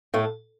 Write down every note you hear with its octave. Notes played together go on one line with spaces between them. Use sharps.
A2 A3